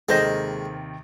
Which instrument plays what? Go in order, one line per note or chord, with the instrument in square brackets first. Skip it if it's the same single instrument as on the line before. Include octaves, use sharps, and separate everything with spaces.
[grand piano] D#2 C3 D#3 [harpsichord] G#3 [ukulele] A4 C5 D#5